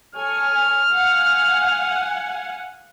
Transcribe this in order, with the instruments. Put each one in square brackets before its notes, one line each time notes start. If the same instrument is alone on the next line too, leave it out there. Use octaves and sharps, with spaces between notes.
[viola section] A4 C#5 G#5 [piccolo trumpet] F6
[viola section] F5 F#5 G#5